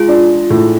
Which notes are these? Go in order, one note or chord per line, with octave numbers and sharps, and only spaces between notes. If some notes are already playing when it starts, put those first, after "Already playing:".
Already playing: G#3 F4
D4
A2